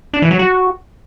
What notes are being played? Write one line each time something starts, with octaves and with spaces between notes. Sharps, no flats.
D4
E3
F#3
F#4